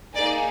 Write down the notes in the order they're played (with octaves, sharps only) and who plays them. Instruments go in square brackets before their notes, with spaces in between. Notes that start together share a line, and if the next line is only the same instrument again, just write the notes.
[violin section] A#3 D#4 G#4 D5